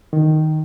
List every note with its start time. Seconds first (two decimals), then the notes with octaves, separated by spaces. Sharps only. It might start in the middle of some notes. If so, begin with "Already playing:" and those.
0.13 D#3